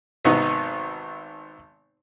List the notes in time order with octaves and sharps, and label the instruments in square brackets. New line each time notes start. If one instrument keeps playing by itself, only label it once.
[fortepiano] G#1 C3 B3 D#4